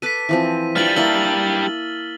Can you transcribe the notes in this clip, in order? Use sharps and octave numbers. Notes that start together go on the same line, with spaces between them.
A4 B4 D6 B6 D#7
E3 F3 C4
G3 D4 F4 B4 G#5 F6 A6 F#7
A#3 E4 A5 E6 F#7 G7